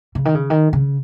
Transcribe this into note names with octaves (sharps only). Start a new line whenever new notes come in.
C#3
D#3
C#3
D#3
C#3